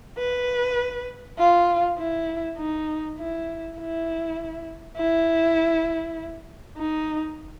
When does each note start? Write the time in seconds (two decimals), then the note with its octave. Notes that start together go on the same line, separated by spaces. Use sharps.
0.18 B4
1.38 F4
1.98 E4
2.58 D#4
3.19 E4
3.78 E4
4.97 E4
6.78 D#4